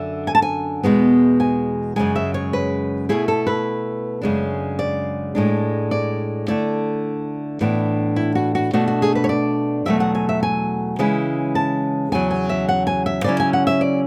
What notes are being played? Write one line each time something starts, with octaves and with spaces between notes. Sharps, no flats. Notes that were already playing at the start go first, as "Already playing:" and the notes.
Already playing: F#2 D3 E5
G#5
A5
G#5
E2 B2 G#3 B3
G#5
F#2 C#3 E3 G#3 G#5
E5
C#5
B4
B2 A3 E4 G#4
A4
B4
F#2 C#3 G#3 D4
D5
A2 G#3 D4
D5
D3 A3 E4 D5
A2 E3 B3 D4
E4
F#4
F#4
B2 A3 D4 F#4
F#4
G#4
B4
C#5
D5
E2 B2 F#3 A3 E5
F#5
G#5
E5
G#5
C#3 E3 G#3 C#4 E4
A5
E2 C#3 F#3 G#5
G#5
E5
F#5
G#5
E5
C#3 F#3 C#4 E4 D5
G#5
F#5
E5
D5